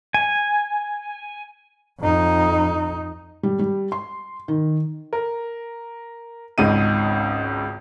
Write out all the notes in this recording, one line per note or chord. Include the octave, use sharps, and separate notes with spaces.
G#5
F2 D#4
G3
G3
C6
D#3
A#4
G#1 C#2 C#3 D#4 D#7